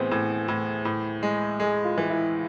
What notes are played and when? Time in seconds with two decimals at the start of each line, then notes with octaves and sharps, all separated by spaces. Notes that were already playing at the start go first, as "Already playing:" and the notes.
Already playing: A2 E3 B3 C4 G#4
0.11 A2
0.48 A2
0.85 A2
1.23 G#3
1.59 G#3 G#4
1.84 F4
1.98 E3
2.10 E4